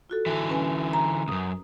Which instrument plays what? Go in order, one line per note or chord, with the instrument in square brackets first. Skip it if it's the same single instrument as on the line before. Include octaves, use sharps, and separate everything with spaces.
[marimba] F4 F#4 A4
[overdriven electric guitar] D3 E3
[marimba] C#4 B4 G#5
A#5
[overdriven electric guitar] C#2 F#2 [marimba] D#6